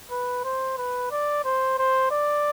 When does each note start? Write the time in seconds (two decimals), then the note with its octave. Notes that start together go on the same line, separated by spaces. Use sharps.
0.11 B4
0.44 C5
0.78 B4
1.11 D5
1.45 C5
1.78 C5
2.11 D5